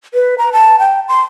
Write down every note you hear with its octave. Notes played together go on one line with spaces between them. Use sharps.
B4
A#5
A5
G5
C6